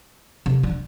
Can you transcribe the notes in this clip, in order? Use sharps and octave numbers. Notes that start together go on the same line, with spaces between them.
C3
D3